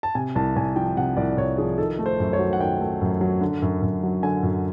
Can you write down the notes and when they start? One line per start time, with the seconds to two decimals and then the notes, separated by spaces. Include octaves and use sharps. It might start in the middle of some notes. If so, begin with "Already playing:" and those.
0.03 A5
0.15 C3 G#5
0.35 C2 A5
0.56 C2 G#5
0.76 F3 G5
0.97 C3 F#5
1.17 C2 D5
1.37 C2 C#5
1.57 F3 G#4
1.78 D#3 A4
1.99 A3
2.06 C5
2.20 F#2
2.33 C#5
2.39 F#3
2.53 F#5
2.60 D#3 G5
2.81 A3
3.01 F#2
3.21 F#3
3.41 D3
3.62 F#2
3.82 F#2
4.03 F#3
4.23 D3 G#5
4.43 F#2